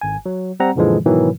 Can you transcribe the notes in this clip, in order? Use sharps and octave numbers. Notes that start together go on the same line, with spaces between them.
G#1 G#5
F#3
G3 C4 F#5 A#5
F#2 A#2 D3 E3 F3 G#3
G#2 B2 D#3 E3 F#3